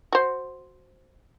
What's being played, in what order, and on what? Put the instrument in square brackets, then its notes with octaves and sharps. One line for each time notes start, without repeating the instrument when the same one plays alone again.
[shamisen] F#4 C5